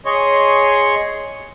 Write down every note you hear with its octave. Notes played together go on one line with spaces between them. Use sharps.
G#4 C#5 D#5 C6 C#6